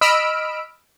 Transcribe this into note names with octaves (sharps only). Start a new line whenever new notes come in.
D#5 B5 E6 F6 B6 D7